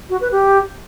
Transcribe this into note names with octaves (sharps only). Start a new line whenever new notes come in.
F#4
B4
G4